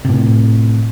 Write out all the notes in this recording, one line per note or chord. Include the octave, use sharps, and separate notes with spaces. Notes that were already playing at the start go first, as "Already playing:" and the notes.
A2 C3